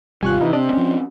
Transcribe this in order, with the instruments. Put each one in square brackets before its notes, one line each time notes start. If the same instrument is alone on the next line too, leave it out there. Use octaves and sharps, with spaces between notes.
[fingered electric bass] G#1 C3 G3 [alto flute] F4 [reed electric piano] G#5 C#6 F#6
[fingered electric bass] C3 [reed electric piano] E3 D#4 E4
[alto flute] C4 [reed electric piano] D4 D5 D#5
[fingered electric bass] F3 C#4